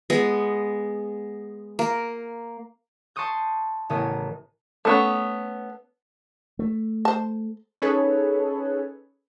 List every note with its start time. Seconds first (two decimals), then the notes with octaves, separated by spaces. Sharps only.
0.10 G#3 B3
1.79 A#3
3.16 A5 C6 C#6 D#6 G6
3.90 A1 C#3 B3 C#4 A#4 D#6
4.85 A3 B3 C#4
6.59 A3
7.05 C5 A5
7.82 C#4 D#4 G#4 A4 B4 C#5